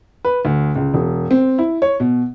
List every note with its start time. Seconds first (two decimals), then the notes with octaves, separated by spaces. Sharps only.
0.25 B4
0.45 D2
0.76 C#2
0.94 E1
1.31 C4
1.58 E4
1.82 C#5
2.00 B2